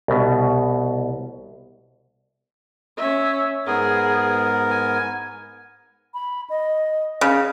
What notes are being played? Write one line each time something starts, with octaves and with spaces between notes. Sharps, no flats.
C2 B2
C#4 E5
G#2 B3 G#4 A#4
G#5
B5
D#5
C#3 F5